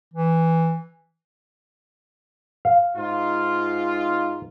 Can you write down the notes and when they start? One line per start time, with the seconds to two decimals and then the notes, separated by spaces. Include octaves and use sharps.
0.14 E3
2.65 F5
2.96 G#2 D#4 F4